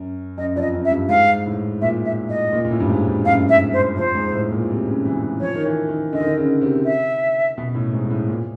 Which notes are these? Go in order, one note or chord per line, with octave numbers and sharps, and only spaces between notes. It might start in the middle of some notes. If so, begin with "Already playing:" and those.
Already playing: F#2
F#2 D#5
F2 D5
D#5
F#2
E5
G2
G#2 F5
A2
A#2 E5
E5
D#5
A#2
A#2
A2
G2
G#2
G2
G2
F#2 F5
E5
C5
F2 C5
G#2
A2
A#2
C3
C#3
E3
E3
F3 C#5
D#3
E3
D#3
D3 D#5
D#3
D3
C#3
C3
E5
B2
A2
G#2
G#2
A2
A#2